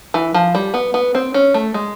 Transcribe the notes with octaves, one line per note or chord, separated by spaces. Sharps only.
E3
F3
G3
B3
B3
C4
C#4
A3
G#3